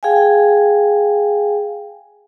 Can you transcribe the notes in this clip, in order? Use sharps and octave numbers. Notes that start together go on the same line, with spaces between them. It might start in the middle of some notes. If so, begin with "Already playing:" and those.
G#4 F5 G5 G#5